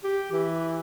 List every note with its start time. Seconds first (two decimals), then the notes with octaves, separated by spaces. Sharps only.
0.03 G4
0.31 E3